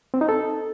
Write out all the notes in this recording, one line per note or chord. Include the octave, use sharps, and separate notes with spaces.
C4
D#4
A4